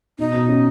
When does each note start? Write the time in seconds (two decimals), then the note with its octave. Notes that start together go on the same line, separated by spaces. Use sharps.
0.19 B2 D#4
0.33 B2
0.48 C#4